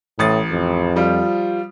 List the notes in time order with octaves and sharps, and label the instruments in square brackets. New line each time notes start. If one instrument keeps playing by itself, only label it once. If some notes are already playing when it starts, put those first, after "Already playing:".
[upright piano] A1 D#6 A6 [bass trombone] A2
[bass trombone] F2
[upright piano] F3 G3 F4